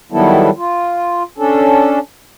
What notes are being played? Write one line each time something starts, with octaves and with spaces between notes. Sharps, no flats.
D#3 F#3 G3 B3 E4 A4
F4
C#4 D4 A4